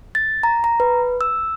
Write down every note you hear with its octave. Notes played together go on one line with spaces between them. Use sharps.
A6
A#5
A#5
B4
E6